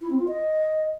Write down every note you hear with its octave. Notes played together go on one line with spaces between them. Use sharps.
E4
C4
F4
D#5